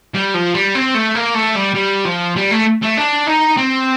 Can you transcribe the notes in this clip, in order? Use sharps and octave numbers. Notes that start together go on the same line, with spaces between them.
G3
F3
G3
C4
A3
A#3
A3
G3
G3
F3
G3
A3
A3
D4
D#4
C4